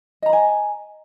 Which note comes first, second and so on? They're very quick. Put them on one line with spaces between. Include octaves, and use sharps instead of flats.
D#5 A#5 B5 G#5